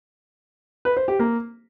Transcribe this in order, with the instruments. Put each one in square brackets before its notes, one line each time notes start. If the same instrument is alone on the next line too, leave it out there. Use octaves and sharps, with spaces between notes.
[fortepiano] B4
C5
G4
A#3